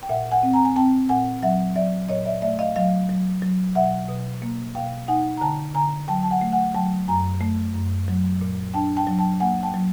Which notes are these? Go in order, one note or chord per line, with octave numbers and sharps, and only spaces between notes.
G5
A#2 E5 F#5
F#5 G#5
C4
G#5 A#5
G#5
C4 G5 A5
A#2 F#5 G#5
F#3 E5 F#5
F#3 D5 E5
A#2 C#5 D#5
D5 E5
A3 D5 E5
D#5 F5
F#3 D#5 F5
F#3
F#3
B2 E5 F#5
B2
A#3
B2 F5 G5
D#4 F#5 G#5
A#5
D3 G5 A5
D3 G#5 A#5
F#3 G5 A5
A5
F#5 G#5
A3
F#5 G#5
F#3 G5 A5
F#2 G#5 A#5
A3
F#2
F#3
A#2
D4 G5 A5
G5 A5
F#3
G5 A5
A#3 F#5 G#5
G5 A5
F#3